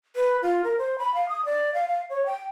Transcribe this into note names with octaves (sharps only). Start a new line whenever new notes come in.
B4
F4
A#4
C5
B5
F5
D#6
D5
F5
F5
C#5
G5